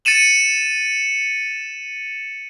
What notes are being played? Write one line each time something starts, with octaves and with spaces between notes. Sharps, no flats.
A6 C#7 D#7 E7 F#7